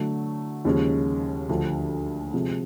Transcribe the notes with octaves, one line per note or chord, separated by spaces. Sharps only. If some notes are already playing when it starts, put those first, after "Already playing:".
Already playing: D3 F#3 A3
D#2 C#3 F3 G#3 C#4
D2 D3 F3
C3 F3 G#3